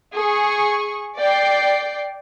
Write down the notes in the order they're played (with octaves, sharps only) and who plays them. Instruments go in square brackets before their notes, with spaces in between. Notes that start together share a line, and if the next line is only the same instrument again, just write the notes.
[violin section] G#4 C#6
D5 G5 C7